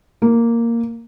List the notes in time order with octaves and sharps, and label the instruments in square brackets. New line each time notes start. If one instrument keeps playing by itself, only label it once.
[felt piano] A#3